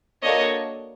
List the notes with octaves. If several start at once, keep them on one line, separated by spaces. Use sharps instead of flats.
A#3 D4 F#4 A4 C#5 D#5